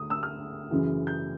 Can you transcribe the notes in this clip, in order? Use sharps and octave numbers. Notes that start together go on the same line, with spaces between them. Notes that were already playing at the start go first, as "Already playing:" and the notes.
Already playing: D2 D#6
E6
F6
F#2 C#3 E3
G6